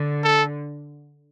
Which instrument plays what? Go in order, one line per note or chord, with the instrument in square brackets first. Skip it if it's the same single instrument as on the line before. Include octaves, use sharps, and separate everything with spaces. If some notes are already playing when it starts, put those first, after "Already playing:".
Already playing: [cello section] D3
[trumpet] A4